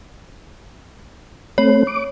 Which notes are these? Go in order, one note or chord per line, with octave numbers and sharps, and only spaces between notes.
A3 C4 C#5
D6